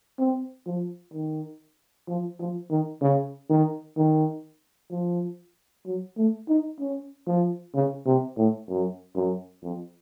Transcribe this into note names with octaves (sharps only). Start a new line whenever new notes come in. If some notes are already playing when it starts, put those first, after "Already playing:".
C4
F3
D#3
F3
F3
D#3
C#3
D#3
D#3
F3
F#3
A3
D#4
C#4
F3
C#3
C3
A2
F#2
F#2
F2